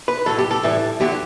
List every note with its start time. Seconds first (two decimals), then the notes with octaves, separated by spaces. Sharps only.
0.08 B4
0.26 A2 F#3 A4
0.38 G4
0.51 A4
0.63 A2 E3 G3
1.00 E2 D3 F#3 G4